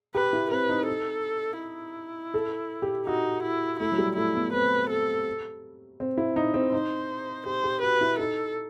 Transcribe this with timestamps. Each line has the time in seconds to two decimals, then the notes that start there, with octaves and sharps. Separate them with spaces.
0.15 G4 B4
0.33 E4
0.51 C4 B4
0.69 D#4
0.88 A4
1.61 E4
2.34 A4
2.82 G4
3.06 D#4 F#4
3.43 E4
3.80 A3 E4
3.92 F#3
3.98 G3
4.17 A3 E4
4.35 B3
4.53 C4 B4
4.90 A4
6.00 C4
6.18 E4
6.36 D#4
6.54 C4
6.72 D#4 C5
7.46 G4 C5
7.64 G4
7.82 F#4 B4
8.01 E4
8.19 D#4 A4